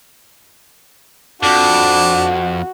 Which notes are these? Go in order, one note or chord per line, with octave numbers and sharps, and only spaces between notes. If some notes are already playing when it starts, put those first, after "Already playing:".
F2 D4 F#4